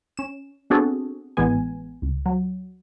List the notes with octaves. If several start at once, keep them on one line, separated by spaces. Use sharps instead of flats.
C#4 E7
B3 C4 D4 F#4 G#4 A4
A1 E3 G#3 B3 G#5
C#2
F#3